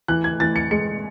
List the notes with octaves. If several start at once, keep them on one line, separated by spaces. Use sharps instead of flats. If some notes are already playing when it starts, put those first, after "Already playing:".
E3 F#6
G#6
E3 A6
C#7
G#3 C#7